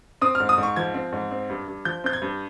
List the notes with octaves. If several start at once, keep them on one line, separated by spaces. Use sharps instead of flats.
C4 D#6
F6
G#2
D#6
G#2
C#6
F3 G#6
C4
G#2
C4
G2
G2
F3 G6
C4 G6
G#6
G2